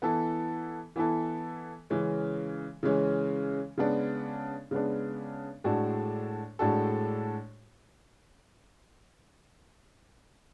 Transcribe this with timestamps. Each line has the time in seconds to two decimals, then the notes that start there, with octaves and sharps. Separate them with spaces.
0.02 E3 B3 E4 A4
0.96 E3 B3 E4 A4
1.90 C#3 E3 G#3 C#4
2.83 C#3 E3 G#3 C#4
3.78 C#3 G#3 B3 D4
4.71 C#3 G#3 B3 D4
5.64 A2 G#3 D4 F#4 A4
6.59 A2 G#3 D4 F#4 A4